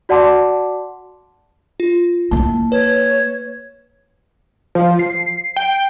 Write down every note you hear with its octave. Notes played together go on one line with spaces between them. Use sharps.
F#4 D5 F#5 A5 C6 D6
F4
A#3 E4 A5
B4 C#5
F3
C7
G5